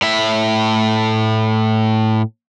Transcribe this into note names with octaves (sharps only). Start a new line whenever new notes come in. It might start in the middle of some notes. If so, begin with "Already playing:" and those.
A2 E5